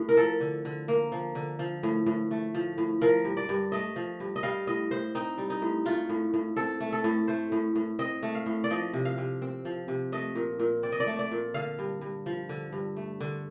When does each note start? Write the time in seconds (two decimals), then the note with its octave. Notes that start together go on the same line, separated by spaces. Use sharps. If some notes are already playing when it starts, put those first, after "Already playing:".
Already playing: A2
0.09 A#4
0.17 F3 A4
0.40 D3
0.65 D3
0.88 A#3
1.12 F3
1.35 D3
1.59 F3
1.83 A2
2.06 A2
2.31 A3
2.54 F3
2.78 A2
3.01 F3 A#4
3.25 G2
3.37 D5
3.49 G2
3.72 A3 D#5
3.96 F3
4.20 G2
4.36 D#5
4.43 G3 F5
4.67 A2 D#5
4.91 A2 C5
5.15 C4 D#4
5.38 G3
5.50 D#4
5.62 A2
5.85 A3 F4
6.09 A2
6.34 A2
6.56 C4 A4
6.80 A3
6.92 A4
7.04 A2
7.28 A3 C5
7.52 A2
7.75 A2
7.99 C4 D#5
8.22 A3
8.35 F5
8.46 A2
8.64 D5
8.70 F3 D#5
8.93 C3
9.05 F5
9.18 C3
9.42 C4
9.65 F3
9.88 C3
10.12 A3 D#5
10.35 A#2
10.59 A#2
10.83 C4 D5
10.92 D#5
11.00 D5
11.07 A3
11.19 D5
11.31 A#2
11.54 D3 F5
11.79 G2
12.01 G2
12.26 F3
12.49 D3
12.72 G2
12.96 A3
13.20 D3